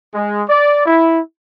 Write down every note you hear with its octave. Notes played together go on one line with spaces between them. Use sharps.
G#3
D5
E4